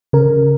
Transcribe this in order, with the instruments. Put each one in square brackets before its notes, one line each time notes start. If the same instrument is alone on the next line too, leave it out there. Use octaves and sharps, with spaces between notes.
[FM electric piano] C#3 A#4